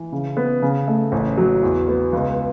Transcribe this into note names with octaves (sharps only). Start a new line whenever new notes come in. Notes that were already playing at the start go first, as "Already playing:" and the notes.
Already playing: E3
C#3
B3
C#3
A3
A1
F#3
E2
B3
C#2